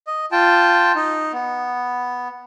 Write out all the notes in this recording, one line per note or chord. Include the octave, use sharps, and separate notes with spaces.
D#5
F4 G5 A5
D#4
B3